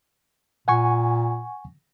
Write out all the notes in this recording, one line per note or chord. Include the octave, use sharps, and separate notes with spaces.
A#2 F#5 G#5 C#6